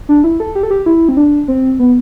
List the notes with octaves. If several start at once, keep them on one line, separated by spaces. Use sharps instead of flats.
D4
E4
A4
G4
A4
G4
E4
C4
D4
C4
B3